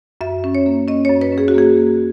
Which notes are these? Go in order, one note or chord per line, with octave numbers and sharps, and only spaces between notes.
F#2 E5
C#4
C#5
A#3
C#4 D#5
F#2 C#5
B4
C#4
G#4
F#4
A#3 G#4
A#3